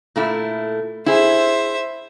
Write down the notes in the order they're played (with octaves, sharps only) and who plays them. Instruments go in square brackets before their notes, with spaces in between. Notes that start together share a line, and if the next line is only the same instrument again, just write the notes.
[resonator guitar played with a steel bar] A#2 A3 E4
[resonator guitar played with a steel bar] E4 G#4 [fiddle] C5 E5